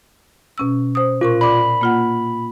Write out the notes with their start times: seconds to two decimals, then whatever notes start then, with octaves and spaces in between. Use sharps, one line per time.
0.58 B2 C#4 E6
0.95 C5 D#6
1.21 A#2 F4 A#4 C#6
1.41 D5 B5 D6
1.81 A#3 F4 F#5